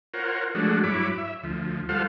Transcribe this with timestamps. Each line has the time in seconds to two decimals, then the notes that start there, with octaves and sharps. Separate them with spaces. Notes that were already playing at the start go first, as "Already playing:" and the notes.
0.14 F4 A#4 C5 C#5 F#5
0.55 F3 G#3 A3 D4 F#4
0.84 G2 F#3 E4 C#5 B5 D6
1.18 E5
1.44 D2 F3
1.89 G3 F4 A4 C5 F5 F#5